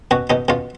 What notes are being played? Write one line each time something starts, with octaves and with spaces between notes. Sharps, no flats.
B2 F#4
B2 D#4
B2 F4